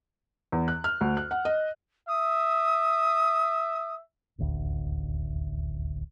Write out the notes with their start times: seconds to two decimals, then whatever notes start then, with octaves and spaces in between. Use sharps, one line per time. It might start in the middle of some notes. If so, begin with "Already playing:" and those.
0.52 E2
0.68 F#6
0.84 F6
1.01 D2
1.17 F#6
1.31 F#5
1.45 D#5
2.08 E5 D#6
4.38 D#1 A1 D2